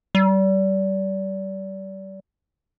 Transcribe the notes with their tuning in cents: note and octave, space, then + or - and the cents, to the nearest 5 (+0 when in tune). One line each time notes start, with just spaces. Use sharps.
G3 -30